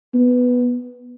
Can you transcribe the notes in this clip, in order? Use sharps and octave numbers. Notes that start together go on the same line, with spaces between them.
B3